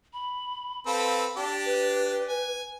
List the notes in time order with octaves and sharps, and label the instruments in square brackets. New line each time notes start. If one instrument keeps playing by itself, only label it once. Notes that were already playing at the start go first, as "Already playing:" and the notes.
[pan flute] B5
[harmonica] C4 A4 B4 [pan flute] F5
[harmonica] D4 G4 [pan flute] A5
[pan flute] B4
[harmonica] G#5